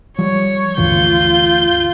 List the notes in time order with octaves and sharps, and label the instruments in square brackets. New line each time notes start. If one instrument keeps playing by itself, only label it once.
[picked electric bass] F3 G3 [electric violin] C#5
[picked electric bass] D2 G2 E3 [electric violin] F4 G6